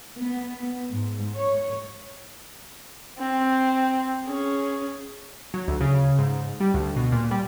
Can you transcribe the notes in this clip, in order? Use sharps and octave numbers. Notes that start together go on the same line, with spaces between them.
B3
G#2
C#5
C4
C#4 G#4
F#3
D2
C#3
G#2
G3
D2
B2
A#2
G3